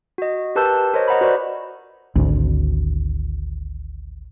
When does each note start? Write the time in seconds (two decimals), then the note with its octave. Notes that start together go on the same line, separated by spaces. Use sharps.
0.18 F#4 D#5
0.56 G4 A#4 B4 A5 E6 G6
0.94 A#4 C5 C#5 D#5
1.08 D#5 F#5 A#5 B5
1.21 F#4 B4 C5 D5
2.16 G#1 D2